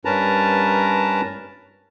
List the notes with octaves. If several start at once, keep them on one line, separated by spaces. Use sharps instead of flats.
G2 C#4 A#4 B4 A5 A#5